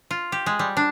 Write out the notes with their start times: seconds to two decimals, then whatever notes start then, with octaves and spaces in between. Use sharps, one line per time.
0.11 F4
0.32 G4
0.46 G#3
0.59 G3
0.77 D4